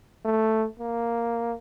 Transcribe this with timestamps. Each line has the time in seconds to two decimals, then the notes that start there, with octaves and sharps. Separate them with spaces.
0.25 A3
0.79 A#3